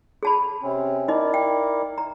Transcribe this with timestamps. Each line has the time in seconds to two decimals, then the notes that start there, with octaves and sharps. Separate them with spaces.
0.23 G#4 A5 B5
0.63 C3 C4 C#4
1.08 D#4 E4 A#4 D5 D#5
1.34 G5
1.98 A#5